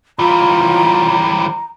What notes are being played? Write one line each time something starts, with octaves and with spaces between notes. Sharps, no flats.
E3 G3 F4 A#5